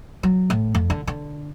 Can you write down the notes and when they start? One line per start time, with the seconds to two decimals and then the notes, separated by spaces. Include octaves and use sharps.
0.23 F#3
0.50 A2
0.75 F2
0.90 D3
1.07 D3